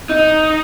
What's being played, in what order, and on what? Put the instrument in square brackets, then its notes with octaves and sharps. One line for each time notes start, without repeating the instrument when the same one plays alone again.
[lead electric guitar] D#4